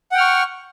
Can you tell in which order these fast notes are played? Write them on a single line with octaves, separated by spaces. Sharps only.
F#5 G5 F6 C#6